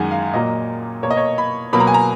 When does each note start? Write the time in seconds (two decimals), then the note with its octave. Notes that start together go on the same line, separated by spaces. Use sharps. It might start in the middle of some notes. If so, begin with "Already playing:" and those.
Already playing: F#2 D#3 G#3 F#5 G#5
0.11 F5
0.33 A#2 F#3 A#3 D#5
1.03 B2 A#3 C#5
1.11 D#5
1.17 C#5
1.38 B5
1.73 B2 F#3 A#3 B5
1.80 A#5
1.87 G#5
1.94 A#5